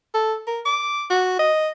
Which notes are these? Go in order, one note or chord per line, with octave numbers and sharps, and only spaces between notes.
A4
A#4
D6
F#4
D#5